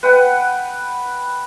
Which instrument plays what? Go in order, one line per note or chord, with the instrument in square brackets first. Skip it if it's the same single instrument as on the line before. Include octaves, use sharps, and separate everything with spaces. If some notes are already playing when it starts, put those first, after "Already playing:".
[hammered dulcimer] B4 F#5 G5